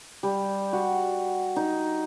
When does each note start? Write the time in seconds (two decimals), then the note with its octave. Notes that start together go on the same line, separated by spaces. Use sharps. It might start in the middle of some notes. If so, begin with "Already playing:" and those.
0.23 G3
0.73 F#4
1.56 D#4